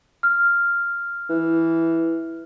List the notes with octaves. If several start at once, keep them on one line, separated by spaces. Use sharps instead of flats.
F6
E3